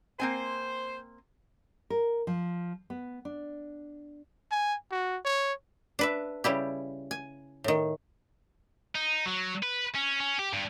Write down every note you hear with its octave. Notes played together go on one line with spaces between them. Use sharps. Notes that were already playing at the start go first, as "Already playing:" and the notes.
A#3 C4 C5 G#5
A#4
F3
B3
D4
G#5
F#4
C#5
D4 B4 E5
C#3 G3 E4 G4
G#5
A2 D#3
D#4
F#3
B4
C#4
C#4
G4
G2